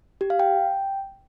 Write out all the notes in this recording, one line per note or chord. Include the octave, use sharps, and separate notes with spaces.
G4
F5
G5